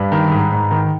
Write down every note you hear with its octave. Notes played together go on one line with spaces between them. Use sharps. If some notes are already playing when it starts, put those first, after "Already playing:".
Already playing: G2 B4
D#3
G#2
G#2
D#3